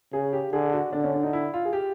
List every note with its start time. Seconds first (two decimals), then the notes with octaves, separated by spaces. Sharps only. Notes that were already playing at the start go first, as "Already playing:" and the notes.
0.13 C#3 G#4
0.33 G4
0.52 D3 G#4
0.73 F#4
0.93 D3 D4
1.04 C#4
1.14 D4
1.23 D#4
1.33 E4
1.54 F4
1.65 G#4
1.73 G4